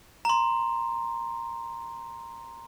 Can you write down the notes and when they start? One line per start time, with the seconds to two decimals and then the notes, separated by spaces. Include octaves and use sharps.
0.25 A#5 C6